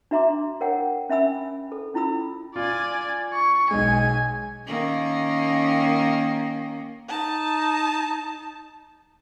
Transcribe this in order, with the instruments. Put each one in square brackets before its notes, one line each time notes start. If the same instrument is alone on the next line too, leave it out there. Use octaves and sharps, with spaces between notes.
[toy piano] D4 F#4 E5 A#5 C6 D6
A#4 C#5 F#5 G5
C#4 E5 G#5 B5 E6
A4
C#4 E4 F4 B5 E6
[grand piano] F4 [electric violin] D5 G#5
[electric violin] C#6
[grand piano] B1 G#3 [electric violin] G#5
[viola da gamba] D#3 A#3 C#4
[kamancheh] D#4 A5